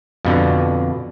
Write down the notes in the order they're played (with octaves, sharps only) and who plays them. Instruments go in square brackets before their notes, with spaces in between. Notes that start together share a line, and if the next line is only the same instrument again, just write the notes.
[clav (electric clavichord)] F2 B2 D3